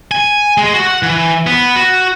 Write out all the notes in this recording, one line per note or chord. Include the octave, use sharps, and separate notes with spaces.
G#5
G#3
F#4
F#5
E3
B3
F#4